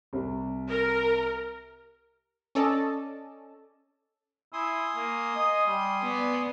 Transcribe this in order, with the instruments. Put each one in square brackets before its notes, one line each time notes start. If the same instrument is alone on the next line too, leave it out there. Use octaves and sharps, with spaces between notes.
[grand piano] C2
[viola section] A#4
[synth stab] C#4 A4 D5 D#5 A5
[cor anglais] E4 [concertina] G#5 C6 D#6
[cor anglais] A#3
D#5
G3
[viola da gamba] B3 [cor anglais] D5